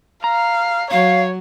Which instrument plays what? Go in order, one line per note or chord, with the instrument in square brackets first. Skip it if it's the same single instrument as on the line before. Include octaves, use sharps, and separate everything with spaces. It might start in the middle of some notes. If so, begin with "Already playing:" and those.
[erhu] F5 [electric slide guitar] A#5
[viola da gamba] F#3 [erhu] C#5 [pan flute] F5